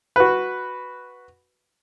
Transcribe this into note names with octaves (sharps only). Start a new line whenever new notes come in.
F#4 B4